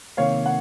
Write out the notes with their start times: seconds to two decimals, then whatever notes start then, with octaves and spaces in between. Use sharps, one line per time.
0.17 C3 D#3 A#3 C#5 F5
0.46 F#5